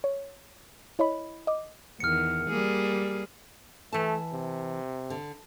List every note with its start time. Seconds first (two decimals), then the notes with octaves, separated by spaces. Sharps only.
0.04 C#5
0.99 E4 C#5 D#5 B5
1.47 D#5 D6
2.00 E2 D#3 F6 C#7
2.49 G3 A#3 G#4
3.93 E3 A3 A5
4.32 C3
5.10 D3